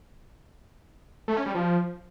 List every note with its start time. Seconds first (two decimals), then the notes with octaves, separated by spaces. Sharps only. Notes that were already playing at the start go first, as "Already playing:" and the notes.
1.28 A3
1.37 C#4
1.46 G3
1.55 F3